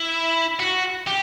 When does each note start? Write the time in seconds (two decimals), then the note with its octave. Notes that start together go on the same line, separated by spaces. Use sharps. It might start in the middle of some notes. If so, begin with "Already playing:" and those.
Already playing: E4
0.60 F#4
1.07 G4